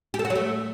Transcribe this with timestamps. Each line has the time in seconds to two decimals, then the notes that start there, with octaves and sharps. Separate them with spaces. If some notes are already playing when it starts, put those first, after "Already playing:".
0.14 G4
0.19 A4
0.25 F#4
0.30 F#3
0.35 A3